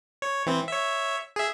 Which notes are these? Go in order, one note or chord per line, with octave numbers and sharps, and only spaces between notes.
C#5
E3 C4
C#5 E5
G#4 E5